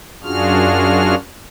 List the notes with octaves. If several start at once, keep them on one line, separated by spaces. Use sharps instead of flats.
F#2 D4 F4 F#4 G#4 F6